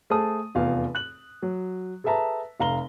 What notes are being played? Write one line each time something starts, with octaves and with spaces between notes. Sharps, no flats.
A3 G#4 C5 A5 D#6
F1 E2 F4 F5
F#6 F#7
F#3
G#4 A4 B4 E5 A5 A#5
F1 F5 A#5 G7